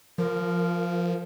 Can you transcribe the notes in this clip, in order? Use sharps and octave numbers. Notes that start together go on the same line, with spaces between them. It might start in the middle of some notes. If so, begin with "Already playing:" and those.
F3 A#4